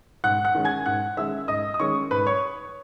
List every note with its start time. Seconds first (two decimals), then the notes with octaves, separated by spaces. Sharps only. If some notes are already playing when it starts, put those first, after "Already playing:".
0.24 G#2 F#5 F#6
0.45 F#5 F#6
0.55 D#3 G#3 C#4
0.65 G#5 G#6
0.86 G#2 F#5 F#6
1.17 D#3 G#3 C#4 E5 E6
1.48 G#2 D#5 D#6
1.74 D#6
1.79 D#3 G#3 C#4 C#5 C#6
2.11 G#2 B4 B5
2.26 C#5 C#6